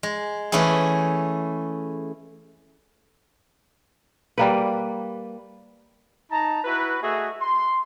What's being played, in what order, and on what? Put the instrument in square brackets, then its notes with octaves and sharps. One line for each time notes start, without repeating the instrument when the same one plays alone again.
[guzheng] G#3
E3 A3 C#4 E4 G#4
[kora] G3 A#3 B4
[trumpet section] D#4 A5 A#5
E4 F#4 B4
A3 F#4 G#4 D#5 E5
C6